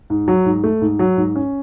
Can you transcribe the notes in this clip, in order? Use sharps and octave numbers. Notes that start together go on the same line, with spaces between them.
G#2
F#3
G#2
A3
G#2
F#3
G#2
C#4